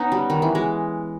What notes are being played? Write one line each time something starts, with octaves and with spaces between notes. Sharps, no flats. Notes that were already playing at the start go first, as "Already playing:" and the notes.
Already playing: B3 C#4 D#4
G3
D#3
E3
G#3